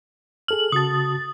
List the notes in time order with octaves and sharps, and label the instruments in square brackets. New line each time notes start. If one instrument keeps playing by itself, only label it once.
[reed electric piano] G#4 A4 F6 [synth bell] F#7
[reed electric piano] C#3 F#4 A5 [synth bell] D#6 A6